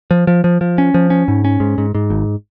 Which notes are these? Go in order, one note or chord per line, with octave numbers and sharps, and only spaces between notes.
F3
F3
F3
F3
C#4
F3
C#4
G#2
C#4
G#2
G#2
G#2
G#1